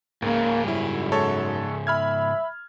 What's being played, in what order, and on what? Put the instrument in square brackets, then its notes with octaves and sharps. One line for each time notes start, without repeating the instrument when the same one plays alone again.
[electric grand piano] C#2 [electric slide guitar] G#2 C#3 [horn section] A#3
[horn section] F#2 [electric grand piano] G3 E4
[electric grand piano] G#3 A4 C#5
[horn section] E5 [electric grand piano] B5 F6 G#6